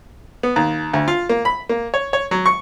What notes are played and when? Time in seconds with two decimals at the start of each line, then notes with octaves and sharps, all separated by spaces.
0.43 B3
0.56 D#2
0.93 D2
1.08 F4
1.29 A#3
1.45 B5
1.69 A#3
1.94 C#5
2.13 C#5
2.31 F#3
2.46 C#6